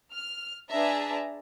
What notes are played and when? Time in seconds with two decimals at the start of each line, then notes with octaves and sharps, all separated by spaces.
0.13 F6
0.70 D4 G#4 B4 E5 A5 A#5